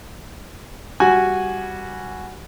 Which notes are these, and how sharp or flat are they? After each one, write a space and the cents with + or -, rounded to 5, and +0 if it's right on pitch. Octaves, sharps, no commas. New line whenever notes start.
G3 +0 F#4 +0 G#5 +0